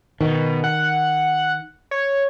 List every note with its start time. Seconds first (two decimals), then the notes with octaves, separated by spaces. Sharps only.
0.21 B2 D#3
0.64 F#5
1.91 C#5